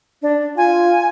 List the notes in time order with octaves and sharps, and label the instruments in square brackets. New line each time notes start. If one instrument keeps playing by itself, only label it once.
[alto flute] D4
[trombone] F4 [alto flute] G#5